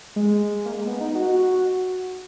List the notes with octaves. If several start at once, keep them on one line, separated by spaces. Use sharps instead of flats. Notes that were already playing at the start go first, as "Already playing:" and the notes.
G#3
A#3
G#3
B3
D#4
F#4
F#4